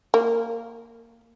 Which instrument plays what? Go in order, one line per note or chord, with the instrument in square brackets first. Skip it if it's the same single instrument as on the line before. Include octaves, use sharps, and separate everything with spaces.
[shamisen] A#3